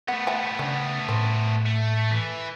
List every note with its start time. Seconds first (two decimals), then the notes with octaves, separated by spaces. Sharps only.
0.08 A3 B3 F#5
0.27 E5 F#5 G5
0.59 C#3 C#4 D4
1.09 A2 C4 C#4
1.66 A3
2.12 E3